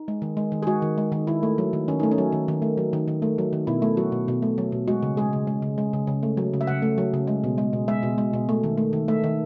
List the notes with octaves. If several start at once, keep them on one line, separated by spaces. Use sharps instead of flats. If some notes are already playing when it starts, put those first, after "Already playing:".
Already playing: D#4
G#3
D#3
G#3
D#3
G#4
G#3 F#4
D#3
G#3
D#3
D#3 E4
A3
F#3
D#3
D#3 C#4
A3 D#4
C#4
F#3
D#3
D#3
A3
F#3
D#3
D#3
A3
F#3
D#3
B2 E4
A3
F#3 F#4
B2
B2
A3
F#3
B2
G#3 F#4
C#3
G#3 G#4
C#3
G#3
C#3
G#3
C#3
C#3
A3
F#3
C#3
E5
C#3 F#5
A3
F#3
C#3
G#3
B2
G#3
B2
G#3 E5
B2
G#3
B2
A3
D#3
A3
D#3
A3 E5
D#3